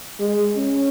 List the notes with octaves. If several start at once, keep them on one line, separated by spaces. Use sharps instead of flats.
G#3
C#4